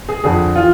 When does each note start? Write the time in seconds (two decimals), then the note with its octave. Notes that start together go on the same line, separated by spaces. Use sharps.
0.09 G#4
0.24 F2 D3 G#4
0.55 E3 F4